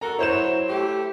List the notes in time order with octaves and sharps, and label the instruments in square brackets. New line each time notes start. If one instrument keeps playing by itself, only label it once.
[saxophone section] F#4 A4 A#4 [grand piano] A#5
[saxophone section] F#3 C#5 [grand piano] E4 C5 E7
[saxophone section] A3 G4